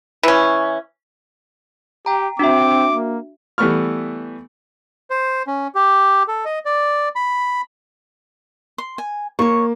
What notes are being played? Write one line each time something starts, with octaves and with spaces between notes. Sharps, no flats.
E3 C#4
G4 G5 A#5
C4 D4 F#4 E5 D6
A#3
E3 G3 A3 B3 C#6 F6
C5
C#4
G4
A4
D#5
D5
B5
C6
G#5
A#3 C#5 C#6